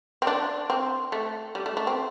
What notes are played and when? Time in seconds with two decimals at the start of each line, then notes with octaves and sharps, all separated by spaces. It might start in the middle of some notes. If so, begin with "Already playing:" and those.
0.22 C4
0.27 D4
0.70 C4
1.12 A3
1.55 G3
1.66 A3
1.77 A3
1.87 C4